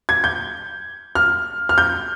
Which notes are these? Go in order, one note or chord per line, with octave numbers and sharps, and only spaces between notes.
G#6
G6
F6
F6
G6